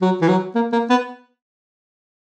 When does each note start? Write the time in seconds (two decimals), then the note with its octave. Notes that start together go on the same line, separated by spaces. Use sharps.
0.02 F#3
0.22 E3
0.28 F#3
0.55 A#3
0.72 A#3
0.90 B3